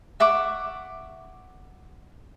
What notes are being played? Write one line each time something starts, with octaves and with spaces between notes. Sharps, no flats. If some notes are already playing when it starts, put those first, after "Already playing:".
E5 F#5 C#6 D6